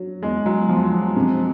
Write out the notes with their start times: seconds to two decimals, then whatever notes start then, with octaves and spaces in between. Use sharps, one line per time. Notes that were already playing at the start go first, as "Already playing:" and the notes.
Already playing: F#3
0.23 E2 G#3
0.46 F#3
0.68 E2 F3
0.93 F3
1.16 C3